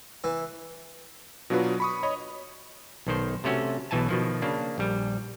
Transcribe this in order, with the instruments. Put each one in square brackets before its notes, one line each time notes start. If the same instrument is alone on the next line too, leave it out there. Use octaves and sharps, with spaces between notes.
[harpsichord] E3
[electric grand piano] B2 F#3 D4 F4 F#4 B4
B5 C#6 D#6
C#5 D#5 B5
[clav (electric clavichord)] B1 D#3 C5
C3 A3 C#4 F#4
B1 B2 E3 G#5 A5
B2 D#3 F3
C#3 A#3 D4
A#1 G3